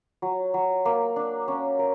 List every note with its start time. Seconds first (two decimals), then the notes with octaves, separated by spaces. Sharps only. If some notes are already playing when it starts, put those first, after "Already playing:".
0.22 F#3
0.54 F#3
0.85 A#3
1.16 D4
1.48 C#4
1.79 A#4